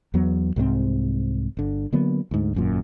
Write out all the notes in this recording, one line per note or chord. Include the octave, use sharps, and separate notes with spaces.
E2 F#3 B3
C2 G#2 F#3 C4
G1 D3
D3 F#3 A#3 B3
D2 G#2
G#1 F#2 A#2